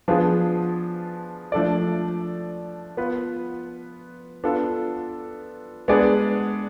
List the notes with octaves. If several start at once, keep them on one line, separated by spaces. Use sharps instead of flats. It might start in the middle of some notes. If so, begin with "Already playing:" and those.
F3 B3 D4 F4 G#4
F3 A3 D4 A4 D5
B3 F4 B4
B3 D4 F4 A4
G#3 B3 D4 G#4 D5